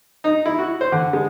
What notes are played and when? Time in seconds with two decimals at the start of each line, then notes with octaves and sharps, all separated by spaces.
0.24 D#4
0.46 E4
0.59 F#4
0.81 C5
0.92 D3
1.13 G#3